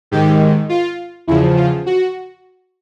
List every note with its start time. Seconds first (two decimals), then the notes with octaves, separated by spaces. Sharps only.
0.11 G#2 D#3 G4
0.69 F4
1.27 E2 C#3 F3 E4
1.57 F4
1.86 F#4